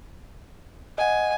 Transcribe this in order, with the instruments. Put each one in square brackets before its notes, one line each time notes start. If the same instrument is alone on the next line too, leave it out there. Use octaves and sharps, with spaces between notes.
[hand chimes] D#5 F#5 [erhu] G#5